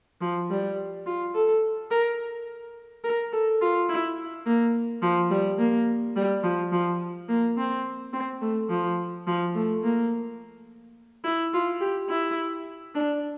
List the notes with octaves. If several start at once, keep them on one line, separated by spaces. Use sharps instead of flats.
F3
G3
F4
A4
A#4
A#4
A4
F4
E4
A#3
F3
G3
A#3
G3
F3
F3
A#3
C4
C4
A3
F3
F3
A3
A#3
E4
F4
G4
E4
D4